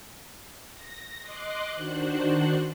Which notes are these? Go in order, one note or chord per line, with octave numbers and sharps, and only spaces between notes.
A#6
D#5 C6 D6 F#6
D#3 D4 F#4 C5 F#6